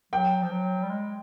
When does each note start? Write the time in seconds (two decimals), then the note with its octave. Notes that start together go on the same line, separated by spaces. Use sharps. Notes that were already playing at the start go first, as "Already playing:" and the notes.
0.13 F#3 G5
0.42 F3
0.51 F#3
0.83 G3
0.90 G#3